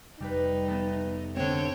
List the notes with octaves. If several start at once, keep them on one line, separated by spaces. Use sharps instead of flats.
F1 G3 D#4 G4 B4
A3 B3 A4
D3 C4 C#5 G5